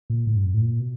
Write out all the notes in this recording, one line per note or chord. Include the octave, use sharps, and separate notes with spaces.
A#2
A2
G2
F#2
A2
A#2
B2